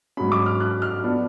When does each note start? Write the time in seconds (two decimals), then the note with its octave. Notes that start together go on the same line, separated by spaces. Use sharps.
0.17 G#2 F#3 C#4 B5
0.32 D6
0.46 F6
0.60 F#6
0.82 F6
1.04 F3 B3 D4